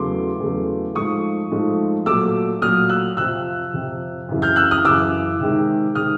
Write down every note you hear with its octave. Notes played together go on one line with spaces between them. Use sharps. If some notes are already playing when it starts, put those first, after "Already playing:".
Already playing: E2 C#3 F#3 A3 C6 D6
E2 C#3 F#3 A3
G#2 F3 A3 C#6 D#6
G#2 F3 A3
A#2 F#3 A3 D6 E6
A#2 F#3 A3 D#6 F6
E6 F#6
F2 C3 F3 E6 F#6
F2 C3 F3
F#2 C#3 E3
F6 G6
E6 F#6
D#6 F6
F#2 C#3 E3 D6 E6
C3 D#3 G#3
C3 D#3 G#3 D#6 F6